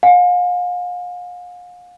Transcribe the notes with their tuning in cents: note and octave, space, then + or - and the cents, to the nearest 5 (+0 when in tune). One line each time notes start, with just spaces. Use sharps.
F5 +40 G#5 -20